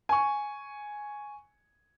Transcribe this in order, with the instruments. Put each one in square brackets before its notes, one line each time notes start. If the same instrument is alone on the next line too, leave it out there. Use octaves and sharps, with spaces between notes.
[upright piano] G#5 C#6